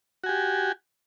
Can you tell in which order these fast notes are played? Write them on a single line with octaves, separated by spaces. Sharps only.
F#4 G#5 G4